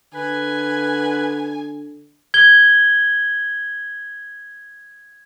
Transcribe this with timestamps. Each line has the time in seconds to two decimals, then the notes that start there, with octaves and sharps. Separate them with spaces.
0.14 D3 B4 G#5
2.34 G#6 G7